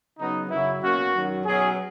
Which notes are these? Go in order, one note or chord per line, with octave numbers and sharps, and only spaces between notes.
C#3 F#3 B3 D#4
F#2 C#3 F#3 E4
B2 A#3 C#4 F#4
F#2 D#3 F#3
B2 F#3 C#4 G#4